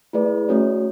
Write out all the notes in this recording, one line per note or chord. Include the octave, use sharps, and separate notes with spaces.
A3 E4 G#4 B4 D5
A3 C#4 F#4 C#5